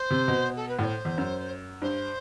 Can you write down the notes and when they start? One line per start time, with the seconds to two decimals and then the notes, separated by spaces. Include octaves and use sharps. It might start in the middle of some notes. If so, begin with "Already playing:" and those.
Already playing: C5
0.10 C3
0.28 B2
0.56 A4
0.68 B4
0.79 A2 D5
0.83 C5
1.05 E2
1.18 F#2
1.82 G2 C5